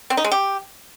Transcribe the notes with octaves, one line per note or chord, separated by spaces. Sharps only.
C4
D#4
G#3
G4